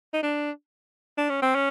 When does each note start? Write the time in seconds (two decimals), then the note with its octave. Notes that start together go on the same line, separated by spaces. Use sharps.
0.13 D#4
0.23 D4
1.18 D4
1.30 C#4
1.42 C4
1.55 C#4